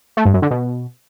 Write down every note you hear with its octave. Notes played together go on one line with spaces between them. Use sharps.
A3
G2
F#2
D3
B2